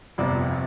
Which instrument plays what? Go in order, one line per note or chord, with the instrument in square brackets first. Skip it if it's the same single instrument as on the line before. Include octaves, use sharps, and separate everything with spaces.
[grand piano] G1 F2 C3 D5